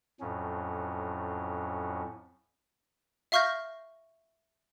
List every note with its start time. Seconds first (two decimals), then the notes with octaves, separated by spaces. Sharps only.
0.21 F2 A2 F#3 C#4
3.32 E5 F5 C#6 F6 G6 A#6